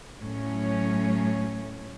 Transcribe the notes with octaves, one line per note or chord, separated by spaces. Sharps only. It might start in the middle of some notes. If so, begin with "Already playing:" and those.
A2 F#3 C#4